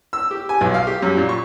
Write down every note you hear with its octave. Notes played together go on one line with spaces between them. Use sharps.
E6
G4
G#5
B1
F5
G4
F#2
A#2
C#6